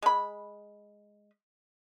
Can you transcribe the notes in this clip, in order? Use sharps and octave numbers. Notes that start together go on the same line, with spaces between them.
G#3 B5